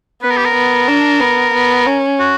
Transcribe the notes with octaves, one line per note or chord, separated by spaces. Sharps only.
B3 B4
A#4
G4
A#4
B3
D4
B3
B3
C#4
F#4